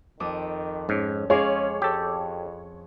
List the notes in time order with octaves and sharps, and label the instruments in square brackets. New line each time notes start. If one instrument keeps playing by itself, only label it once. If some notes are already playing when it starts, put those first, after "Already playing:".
[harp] F2 D6 D#6 [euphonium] D#3
[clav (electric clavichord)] G#2 [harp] C#4
[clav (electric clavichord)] G#3 [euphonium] C#4 [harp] G#4 F5 D6 [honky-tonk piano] C#5
[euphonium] F2 [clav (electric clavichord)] G4 A4